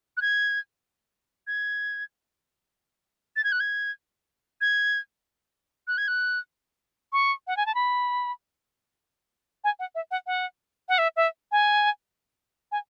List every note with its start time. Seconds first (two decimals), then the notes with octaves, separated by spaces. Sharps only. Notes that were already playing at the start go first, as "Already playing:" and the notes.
0.17 F#6
0.22 G#6
1.47 G#6
3.36 A6
3.44 G#6
3.52 F#6
3.60 G#6
4.61 G#6
5.88 F#6
5.98 G#6
6.08 F#6
7.13 C#6
7.47 F#5
7.57 G#5
7.66 A5
7.75 B5
9.64 G#5
9.79 F#5
9.95 E5
10.11 F#5
10.27 F#5
10.89 F#5
10.98 E5
11.16 E5
11.52 G#5
12.72 G#5